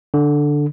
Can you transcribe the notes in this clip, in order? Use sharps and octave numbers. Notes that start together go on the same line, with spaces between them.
D3